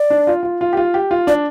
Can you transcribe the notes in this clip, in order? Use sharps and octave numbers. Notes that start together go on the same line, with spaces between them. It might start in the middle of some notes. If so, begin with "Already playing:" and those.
Already playing: D5
D4
F4
F4
F4
G4
F4
G4
F4
D4 D5